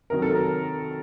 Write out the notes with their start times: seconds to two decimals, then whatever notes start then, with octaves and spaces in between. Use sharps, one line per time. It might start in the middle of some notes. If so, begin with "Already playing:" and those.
0.10 C3 D#3 F#3 A#4
0.22 A4
0.35 A#4